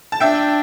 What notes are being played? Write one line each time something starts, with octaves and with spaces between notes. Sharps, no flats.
A5
D4 E5 G5